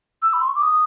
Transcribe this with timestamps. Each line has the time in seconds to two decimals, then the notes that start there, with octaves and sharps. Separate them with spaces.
0.22 E6
0.33 B5
0.41 C6
0.48 C#6
0.55 D6
0.62 D#6